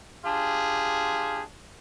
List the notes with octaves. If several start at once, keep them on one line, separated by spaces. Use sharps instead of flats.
D4 F4 G4 G#4